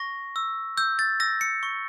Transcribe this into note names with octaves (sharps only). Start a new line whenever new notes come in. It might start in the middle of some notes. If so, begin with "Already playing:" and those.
Already playing: C#6 A#6
E6
E6 G6
A6
E6 A#6
C#7
C#6